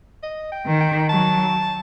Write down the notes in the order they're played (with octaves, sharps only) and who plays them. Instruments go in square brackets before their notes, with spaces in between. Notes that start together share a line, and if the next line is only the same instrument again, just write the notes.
[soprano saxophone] D#5
G5
[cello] D#3
[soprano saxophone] G5
[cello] F#3 [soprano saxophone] A5